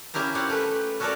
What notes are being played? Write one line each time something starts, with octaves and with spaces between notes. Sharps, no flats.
A#3 C#4 E4 G4 A#5
C4 C#4 F4 G4 F#5
A3 B4
C#4 F#4 A4 A#4 C#5 D5